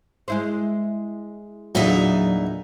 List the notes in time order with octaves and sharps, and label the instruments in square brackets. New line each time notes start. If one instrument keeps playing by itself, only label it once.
[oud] G#3 E4 C5
[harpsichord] E2 D3 [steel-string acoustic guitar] A#2 D#4 E5 [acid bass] F#3